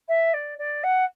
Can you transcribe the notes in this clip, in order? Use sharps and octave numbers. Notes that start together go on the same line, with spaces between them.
E5
D5
D5
F#5